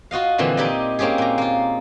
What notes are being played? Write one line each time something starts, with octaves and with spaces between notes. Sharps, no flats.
F4 F#4 D#5 F5
A#2 D3 E3 F3 C4
D#4 E4 G4 D5 D#5
A#3 C4 C#4 G4 G#4
A#2 A#5
A#3 F4